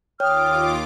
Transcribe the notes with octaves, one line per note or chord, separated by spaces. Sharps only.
D#2 F4 C#5 G5 D6 D#6 F6